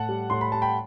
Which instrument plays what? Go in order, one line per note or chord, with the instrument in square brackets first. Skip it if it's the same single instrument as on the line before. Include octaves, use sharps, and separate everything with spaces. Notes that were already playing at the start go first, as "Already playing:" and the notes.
Already playing: [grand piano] A2 F#5 A5
G3
A2 C6
B5
G3 A5
G5 B5